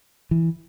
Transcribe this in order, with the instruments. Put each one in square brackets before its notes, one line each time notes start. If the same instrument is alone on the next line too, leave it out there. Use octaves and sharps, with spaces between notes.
[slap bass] E3